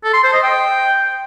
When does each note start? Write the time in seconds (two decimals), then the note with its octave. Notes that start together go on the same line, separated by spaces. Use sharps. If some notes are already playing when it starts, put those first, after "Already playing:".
0.04 A4
0.14 C6
0.23 C5
0.33 D#5
0.43 G5